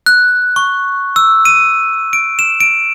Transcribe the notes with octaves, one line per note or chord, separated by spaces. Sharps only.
F#6
C#6
E6
D#7
D7
E7
D7